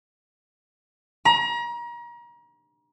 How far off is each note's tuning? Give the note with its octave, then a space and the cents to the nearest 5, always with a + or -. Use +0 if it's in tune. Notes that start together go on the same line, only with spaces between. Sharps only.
A#5 +35